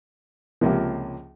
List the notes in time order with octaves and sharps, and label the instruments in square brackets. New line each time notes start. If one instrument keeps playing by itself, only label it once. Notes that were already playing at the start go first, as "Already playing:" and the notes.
[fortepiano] C#2 C3 F3 A#3